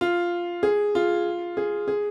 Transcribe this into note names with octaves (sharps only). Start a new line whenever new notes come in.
F4
G#4
F4
G#4
G#4